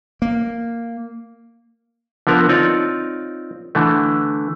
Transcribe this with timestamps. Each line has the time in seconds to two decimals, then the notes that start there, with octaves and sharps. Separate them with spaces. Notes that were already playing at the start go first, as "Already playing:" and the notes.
0.22 A#3
2.27 D3 F3 B3 A#4
2.49 C4 D#4 F4 C#5 D5
3.75 D3 E3 A3